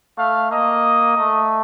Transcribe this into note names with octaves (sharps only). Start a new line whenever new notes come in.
A3 F5
A#3 D#5
A3